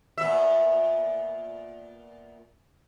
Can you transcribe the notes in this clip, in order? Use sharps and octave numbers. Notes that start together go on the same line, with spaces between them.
A#2 B3 E5